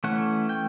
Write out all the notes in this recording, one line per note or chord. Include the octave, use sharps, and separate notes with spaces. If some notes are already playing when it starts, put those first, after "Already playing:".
E3 A3 C#4 F#5
G5